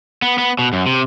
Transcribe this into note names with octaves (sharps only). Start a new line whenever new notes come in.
B3
B3
B2
F#2
C3